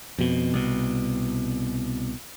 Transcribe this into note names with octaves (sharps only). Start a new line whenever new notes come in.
F2 B2
C2 B2